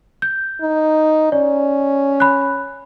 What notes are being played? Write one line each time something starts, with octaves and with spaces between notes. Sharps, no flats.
G6
D#4
C#4 D5
B5 F#6